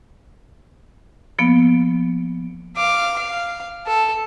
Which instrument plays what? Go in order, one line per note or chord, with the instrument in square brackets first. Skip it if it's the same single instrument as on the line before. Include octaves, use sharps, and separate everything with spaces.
[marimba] F3 A#3 B3
[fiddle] F5 D6
F5
A4